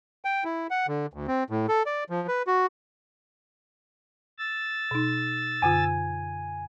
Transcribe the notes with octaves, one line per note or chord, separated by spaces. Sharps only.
G5
E4
F#5
D3
D2
C4
A2
A4
D5
F3
B4
F#4
E6 A6
B2 D#4
F#2 D3 F4 G#5